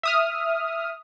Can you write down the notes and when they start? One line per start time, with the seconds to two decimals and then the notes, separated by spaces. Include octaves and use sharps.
0.03 E5 D#6 F6